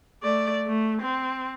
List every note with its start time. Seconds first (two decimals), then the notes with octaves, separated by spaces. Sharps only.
0.23 A3 D5
0.67 A3
1.01 C4